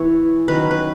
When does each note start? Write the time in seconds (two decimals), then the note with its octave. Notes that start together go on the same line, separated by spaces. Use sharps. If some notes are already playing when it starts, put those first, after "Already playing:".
Already playing: E3 B3 E4 C#5
0.48 D#3 F#3 C#4 B4
0.71 B4